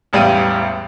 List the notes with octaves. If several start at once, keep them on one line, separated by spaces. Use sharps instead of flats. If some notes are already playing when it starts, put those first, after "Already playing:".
E1 A1 G3 F5 G5 D#7